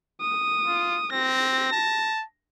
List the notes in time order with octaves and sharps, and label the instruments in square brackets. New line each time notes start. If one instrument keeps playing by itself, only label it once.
[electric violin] D#6
[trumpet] F4
[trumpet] C4 [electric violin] A#6
[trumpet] A5